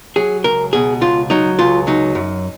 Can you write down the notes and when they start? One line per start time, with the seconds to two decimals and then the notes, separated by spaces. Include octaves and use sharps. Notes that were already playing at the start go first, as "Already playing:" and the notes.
0.16 F#3 G#4
0.44 C#2 A#4
0.73 B2 G#4
1.01 C#2 F4
1.30 F#3 D#4
1.59 C#2 F4
1.87 F#3 D#4
2.15 F#2